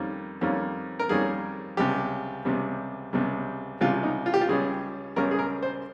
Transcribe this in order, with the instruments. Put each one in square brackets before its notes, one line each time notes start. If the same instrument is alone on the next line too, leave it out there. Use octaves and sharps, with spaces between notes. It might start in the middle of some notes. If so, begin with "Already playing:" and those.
Already playing: [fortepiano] F2 D#3 G3 A#3 C#4
F2 D#3 G3 A#3 C#4
A#4
F2 D#3 G3 A#3 C#4 G#4
C#2 C3 G3 G4
C#2 C3 G3
C#2 C3 G3
C#2 C3 G3 F4
D#4
F4
G4
F4
C#2 C#3 G3 C#4 G#4
C#2 C#3 G3 C#4 A#4
G#4
A#4
C5